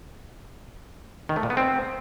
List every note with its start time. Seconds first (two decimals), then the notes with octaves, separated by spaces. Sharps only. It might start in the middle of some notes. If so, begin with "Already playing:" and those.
1.29 D#3
1.36 A3
1.43 A#2
1.50 B3
1.57 C4